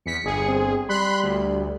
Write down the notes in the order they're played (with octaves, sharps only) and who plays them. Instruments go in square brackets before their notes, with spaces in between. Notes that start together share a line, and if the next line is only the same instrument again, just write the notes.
[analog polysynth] E2 B6 [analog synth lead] C#7
[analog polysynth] G1 G#4
[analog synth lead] C4
[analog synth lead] G3 [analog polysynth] B5 C6 F#6
[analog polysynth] D2